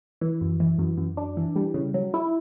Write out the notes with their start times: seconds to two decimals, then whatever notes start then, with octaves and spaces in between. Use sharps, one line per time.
0.21 E3
0.41 F#2
0.60 E3
0.78 F#2
0.97 F#2
1.17 D4
1.37 E3
1.56 G3
1.74 C#3
1.94 F#3
2.14 E4